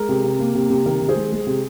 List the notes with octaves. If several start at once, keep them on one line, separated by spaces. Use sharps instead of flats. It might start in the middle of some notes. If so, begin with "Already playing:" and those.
Already playing: G#3 A#4
C3
C3
A#3
C3
C3
D#3 A#4
D#3
G#4 C5
G#3
G#3
C3